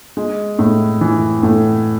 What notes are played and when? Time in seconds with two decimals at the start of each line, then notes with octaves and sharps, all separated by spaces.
0.17 G#3
0.59 A2
1.01 E3
1.43 A2